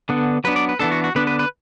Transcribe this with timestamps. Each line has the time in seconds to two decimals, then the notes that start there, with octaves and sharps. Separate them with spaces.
0.09 D3 B3 D4
0.44 F#3 B3 D4 B4
0.56 D5
0.69 B4
0.79 E3 B3 D4 A4
0.91 F#4
1.04 F#4
1.15 D3 B3 D4 B4
1.27 B4
1.39 B4